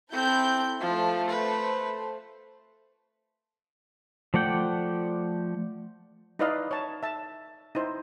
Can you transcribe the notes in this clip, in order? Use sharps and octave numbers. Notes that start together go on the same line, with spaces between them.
C4 E4 A4 G6
F3 A3 C5
B4
F3 A3 D5 F#5 G5
D#4 E4 B4 D5 D#5 F5
C#5 A5
E5 A5
D#4 E4 C5